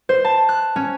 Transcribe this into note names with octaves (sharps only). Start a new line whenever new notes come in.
C5
A5
F#6
C#4